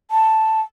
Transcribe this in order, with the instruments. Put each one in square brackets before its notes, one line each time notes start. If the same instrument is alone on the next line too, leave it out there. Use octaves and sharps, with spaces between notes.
[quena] A5